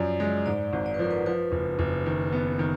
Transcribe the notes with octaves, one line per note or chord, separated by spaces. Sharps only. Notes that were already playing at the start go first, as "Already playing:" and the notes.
Already playing: F#2 F3 D5
G#3
G#2 D5
G#1
D5
B4
F3 A#4
B4
F3 B4
F#1
F#1
D#3
B3
D#3